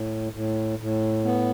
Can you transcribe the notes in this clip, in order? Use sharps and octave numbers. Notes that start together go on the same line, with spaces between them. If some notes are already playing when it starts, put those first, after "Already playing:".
Already playing: A2
A2
A2
B3